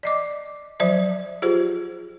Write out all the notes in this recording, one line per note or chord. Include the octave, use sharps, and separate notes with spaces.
D5 D#5 D6
F3 F#3 C5 D5 E5
F4 G4 G#4 C5